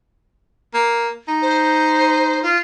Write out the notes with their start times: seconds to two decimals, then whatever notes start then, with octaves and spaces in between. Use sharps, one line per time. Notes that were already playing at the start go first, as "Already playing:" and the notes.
0.74 A#3
1.28 D#4
1.42 C5
2.43 F4